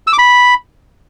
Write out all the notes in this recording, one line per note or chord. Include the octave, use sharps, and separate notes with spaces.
E6
D6
B5